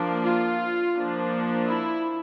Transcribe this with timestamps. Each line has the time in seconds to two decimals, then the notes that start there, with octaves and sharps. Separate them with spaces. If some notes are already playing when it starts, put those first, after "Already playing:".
Already playing: F3 A#3 D4
0.24 F4
0.96 F3 A#3 D4
1.67 E4